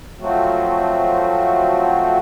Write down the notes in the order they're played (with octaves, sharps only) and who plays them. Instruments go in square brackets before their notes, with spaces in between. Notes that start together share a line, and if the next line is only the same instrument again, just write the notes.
[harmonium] F3 F#3 A3 C4 F#4